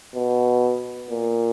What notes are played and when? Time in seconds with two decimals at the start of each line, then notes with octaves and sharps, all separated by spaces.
0.15 B2
1.11 A#2